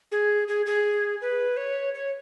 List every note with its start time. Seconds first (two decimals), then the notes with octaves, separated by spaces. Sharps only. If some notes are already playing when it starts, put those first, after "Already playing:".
0.12 G#4
0.48 G#4
0.66 G#4
1.21 B4
1.57 C#5
1.94 C#5